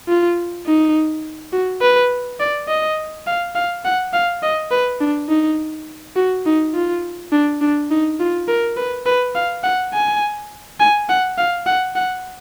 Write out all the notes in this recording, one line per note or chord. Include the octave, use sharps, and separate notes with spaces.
F4
D#4
F#4
B4
D5
D#5
F5
F5
F#5
F5
D#5
B4
D4
D#4
F#4
D#4
F4
D4
D4
D#4
F4
A#4
B4
B4
F5
F#5
G#5
G#5
F#5
F5
F#5
F#5